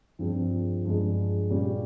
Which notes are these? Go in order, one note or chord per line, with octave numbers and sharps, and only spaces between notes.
G2 F3 C4 F4 G#4
G2 F3 G#3
A#2 G3 C#4